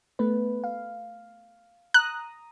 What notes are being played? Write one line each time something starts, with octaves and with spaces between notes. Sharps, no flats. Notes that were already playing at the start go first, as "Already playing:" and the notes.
A3 B3 B4
F5
A#5 D#6 F#6